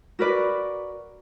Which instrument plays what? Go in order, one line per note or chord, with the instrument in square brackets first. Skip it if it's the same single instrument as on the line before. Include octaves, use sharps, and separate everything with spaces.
[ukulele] F#4 A#4 B4 D5